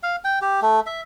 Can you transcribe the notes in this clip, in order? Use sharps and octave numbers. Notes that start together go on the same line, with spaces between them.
F5
G5
G4
A3
E5